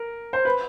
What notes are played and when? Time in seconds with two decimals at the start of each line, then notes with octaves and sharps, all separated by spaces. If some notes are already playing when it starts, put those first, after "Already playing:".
Already playing: A#4
0.33 C5
0.45 B4